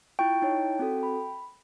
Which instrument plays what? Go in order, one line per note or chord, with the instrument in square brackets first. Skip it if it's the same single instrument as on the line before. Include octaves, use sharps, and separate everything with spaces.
[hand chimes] E4 F4 C#6 [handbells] G5
[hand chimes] D#4 E4 C#5
C4 F#4 A4
B5